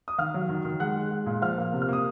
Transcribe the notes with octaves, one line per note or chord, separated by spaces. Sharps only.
D#6
D#3 F5 F6
F#3
D#3
D#3
G#3 F#5 F#6
G#3
G#3
A#2
F3 F5 F6
A#3
C3
F6
A#3 D#6